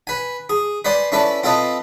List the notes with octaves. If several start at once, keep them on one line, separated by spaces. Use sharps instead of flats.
B4 G#5
G#4
B4 C5 D5 G#5 C6
C#4 E4 A4 B4 D5
C4 F4 A4 B4 D#5